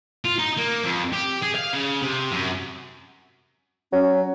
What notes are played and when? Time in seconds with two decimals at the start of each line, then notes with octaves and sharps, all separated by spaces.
0.25 F4
0.39 D#4
0.58 A#3
0.84 F2
1.13 G4
1.42 G#4
1.55 F5
1.73 C#3
2.02 C3
2.32 F#2
3.92 F#3 C#4